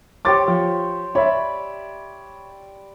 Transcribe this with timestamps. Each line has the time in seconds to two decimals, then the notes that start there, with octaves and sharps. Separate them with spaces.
0.25 G4 C5 C#5 D6 A6
0.48 F3
1.15 C#5 D5 E5 B5